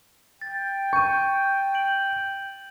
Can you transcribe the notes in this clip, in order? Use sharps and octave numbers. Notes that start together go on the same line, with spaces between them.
G5 A6
C#6 G6 D#7
D7 F#7